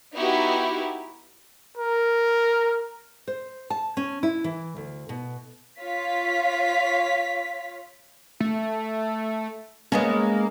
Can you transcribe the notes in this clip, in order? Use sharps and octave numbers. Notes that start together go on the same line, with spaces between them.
B3 D#4 E4 F#4 G4
A#4
C5
A5
C#4
E4
E3
D2
B2
F4 C#5 F5 B6
A3
G#3 A#3 B3 C#4